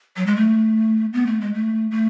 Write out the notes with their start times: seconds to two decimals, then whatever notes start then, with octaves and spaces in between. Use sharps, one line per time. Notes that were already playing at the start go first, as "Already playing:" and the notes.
0.17 F#3
0.26 G#3
0.36 A3
1.13 B3
1.26 A3
1.41 G#3
1.54 A3
1.91 A3